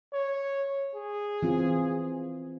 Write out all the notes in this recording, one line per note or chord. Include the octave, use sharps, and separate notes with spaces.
C#5
G#4
E3 C4 F4